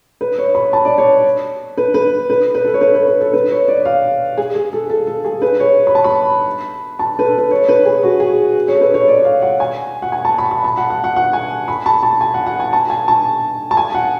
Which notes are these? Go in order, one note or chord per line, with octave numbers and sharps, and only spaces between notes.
B4
C#5
B5
A5
D5
C#5
B4
B4
B4
B4
A4
C#5
B4
B4
B4
A4
B4
C#5
D5
F5
G#4
G#4
A4
A4
A4
G#4
B4
C#5
B5
A5
B5
A5
B4
A4
B4
C#5
B4
G#4
F#4
G#4
C#5
A4
B4
C#5
D5
F5
F#5
G#5
F#5
G#5
A5
B5
B5
A5
F#5
F#5
F#5
F#5
G#5
B5
A5
A5
G#5
F#5
F#5
G#5
A5
G#5
A5
A5
G#5
F#5